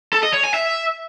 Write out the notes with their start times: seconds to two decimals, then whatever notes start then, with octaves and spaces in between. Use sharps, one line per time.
0.13 A4
0.23 D#5
0.33 C#5
0.44 G#5
0.54 E5